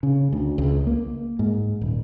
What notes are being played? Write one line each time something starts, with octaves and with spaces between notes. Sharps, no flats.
C#3
D2
C#2
A#3
G#2
D#1